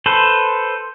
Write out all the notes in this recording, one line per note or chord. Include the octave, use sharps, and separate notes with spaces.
A4 B4 C5